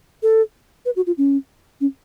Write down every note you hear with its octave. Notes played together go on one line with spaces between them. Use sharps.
A4
B4
F#4
F4
C#4
C#4